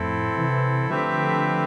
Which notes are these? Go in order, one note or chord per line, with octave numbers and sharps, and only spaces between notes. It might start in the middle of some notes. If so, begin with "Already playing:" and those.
Already playing: F2 A2 C4 E4 A4
C3 E3
D3 F3 A3 C4 G4 B4 E5